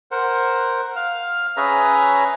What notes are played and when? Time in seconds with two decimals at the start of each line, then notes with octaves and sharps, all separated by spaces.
0.11 A#4 C5 F#5
0.96 F5 F6
1.57 C#4 G#4 B4 C#5 E5 A#5